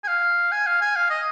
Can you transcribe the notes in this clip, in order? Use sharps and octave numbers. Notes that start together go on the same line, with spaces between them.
G#5
F5
G#5
F5
G#5
F5
D#5